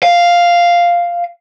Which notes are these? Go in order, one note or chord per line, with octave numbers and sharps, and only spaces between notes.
F5